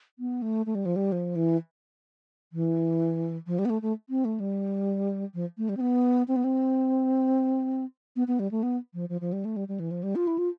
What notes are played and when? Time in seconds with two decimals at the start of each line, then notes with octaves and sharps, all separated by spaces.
0.19 B3
0.42 A3
0.66 A3
0.75 G3
0.86 F3
0.96 G3
1.12 F3
1.36 E3
2.53 E3
3.47 F3
3.59 G3
3.65 B3
3.70 A3
3.82 A3
4.09 C4
4.25 A3
4.40 G3
5.34 F3
5.58 A3
5.69 G3
5.77 C4
5.81 B3
6.28 C4
6.36 B3
6.44 C4
8.16 B3
8.28 B3
8.40 G3
8.51 A3
8.63 B3
8.94 F3
9.09 F3
9.21 F3
9.33 G3
9.45 A3
9.56 G3
9.68 G3
9.80 E3
9.91 F3
10.03 G3
10.16 F4
10.27 E4
10.38 F4